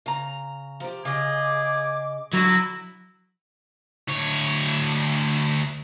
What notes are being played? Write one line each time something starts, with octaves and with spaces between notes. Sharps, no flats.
C#3 A#5
F3 G4
C#3 G#4 D#5 D6
D3 F#3 E4 A#6
D2 C#5